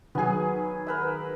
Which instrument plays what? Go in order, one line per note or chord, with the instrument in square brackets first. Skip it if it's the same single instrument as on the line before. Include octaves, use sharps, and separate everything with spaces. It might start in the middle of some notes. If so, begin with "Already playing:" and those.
[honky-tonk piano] D#3 F#3 G#5 [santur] B3 G#4
[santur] A#4 B4 E5